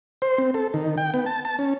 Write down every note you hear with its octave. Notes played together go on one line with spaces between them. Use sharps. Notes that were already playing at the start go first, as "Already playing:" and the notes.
C5
C4
A4
D#3
G5
B3
A5
A5
C#4